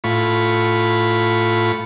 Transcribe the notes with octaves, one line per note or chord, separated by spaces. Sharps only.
A2 F4 B5 C#6